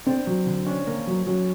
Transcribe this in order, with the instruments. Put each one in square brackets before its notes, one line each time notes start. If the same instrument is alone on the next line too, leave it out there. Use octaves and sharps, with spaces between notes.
[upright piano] C4 [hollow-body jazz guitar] D4
[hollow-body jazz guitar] F#3
D3
[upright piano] C#4 [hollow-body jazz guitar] D4
[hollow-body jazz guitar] A#3
F#3
[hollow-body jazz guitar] F#3 [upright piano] C#4